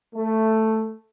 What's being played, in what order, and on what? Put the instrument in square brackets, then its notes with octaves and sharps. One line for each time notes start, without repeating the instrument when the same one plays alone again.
[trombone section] A3